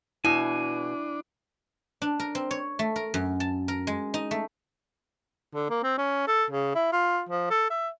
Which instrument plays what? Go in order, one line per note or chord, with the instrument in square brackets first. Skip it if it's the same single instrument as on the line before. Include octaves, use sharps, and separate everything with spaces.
[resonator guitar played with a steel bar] B2 [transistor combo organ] D4 [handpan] E4 [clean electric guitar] G#5
[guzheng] D4
A#4
C4
C#5
A3
A#4
F#2
A5
A#4
G#3
D#4
A3
[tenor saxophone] D3
A#3
C4
C#4
A4
C#3
E4
F4
F3
A4
E5